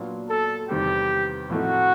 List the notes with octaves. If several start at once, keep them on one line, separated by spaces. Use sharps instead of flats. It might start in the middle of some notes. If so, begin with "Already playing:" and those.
Already playing: A#2 F#3 B3 D4 F4
A4
E2 C3 D#3 G3 C4 G4
A2 F3 A3 C4 D#4 F#4